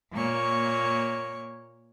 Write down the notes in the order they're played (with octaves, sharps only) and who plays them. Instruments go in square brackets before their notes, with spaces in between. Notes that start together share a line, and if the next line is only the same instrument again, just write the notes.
[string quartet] A#2 A#3 C#5 C#6